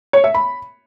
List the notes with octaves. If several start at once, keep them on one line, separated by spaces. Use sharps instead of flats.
C#5
E5
B5